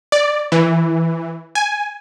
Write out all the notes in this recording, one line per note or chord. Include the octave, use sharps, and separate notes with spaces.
D5
E3
G#5